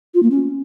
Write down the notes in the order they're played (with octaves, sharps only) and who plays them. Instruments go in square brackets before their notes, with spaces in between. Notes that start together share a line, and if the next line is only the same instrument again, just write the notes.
[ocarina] F4
A#3
C#4